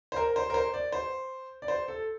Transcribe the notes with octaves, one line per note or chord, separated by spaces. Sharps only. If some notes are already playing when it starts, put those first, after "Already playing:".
C5
A#4
C5
A#4
C5
D5
C5
D5
C5
A4